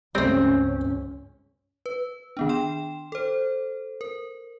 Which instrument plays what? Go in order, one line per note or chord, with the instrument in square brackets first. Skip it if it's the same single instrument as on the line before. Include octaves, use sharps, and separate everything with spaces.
[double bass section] C#2 G2 C#4 [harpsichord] G3 A3 [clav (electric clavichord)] C4
[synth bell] B4
D#3 B3 D4
G5 C6 E7
A4 C5
A#4